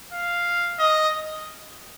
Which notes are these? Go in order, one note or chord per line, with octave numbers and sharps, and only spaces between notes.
F5
D#5